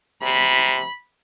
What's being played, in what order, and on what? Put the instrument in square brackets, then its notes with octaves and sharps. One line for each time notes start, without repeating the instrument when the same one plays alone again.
[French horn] C3 [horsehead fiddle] B5